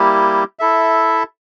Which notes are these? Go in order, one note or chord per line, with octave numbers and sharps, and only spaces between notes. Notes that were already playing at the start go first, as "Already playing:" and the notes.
Already playing: G3 A#3 E4 G4
E4 A4 E5